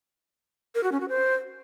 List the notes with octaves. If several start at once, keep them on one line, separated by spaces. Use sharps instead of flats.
A#4
F#4
C#4
F#4
C5